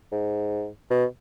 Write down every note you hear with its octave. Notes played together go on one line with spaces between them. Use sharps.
G#2
B2